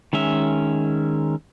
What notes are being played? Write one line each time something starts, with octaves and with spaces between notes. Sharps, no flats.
D#3 G#3 C#4 E5